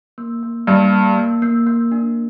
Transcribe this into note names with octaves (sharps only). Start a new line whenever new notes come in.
A#3
A#3
G2 A#3
A#3
A#3
A#3
A#3
D4